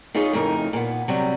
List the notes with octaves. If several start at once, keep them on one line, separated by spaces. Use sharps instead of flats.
D#4 F4 G#4 B4 C#5
F2 A2 C#3 D#4 A#4
A#2 B3
C3 F#3 G3